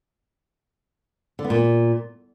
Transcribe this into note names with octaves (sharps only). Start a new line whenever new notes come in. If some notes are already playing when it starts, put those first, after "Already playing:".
D3
B3
A#2